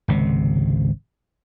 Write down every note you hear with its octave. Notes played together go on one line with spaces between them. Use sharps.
G#1 C#2 C3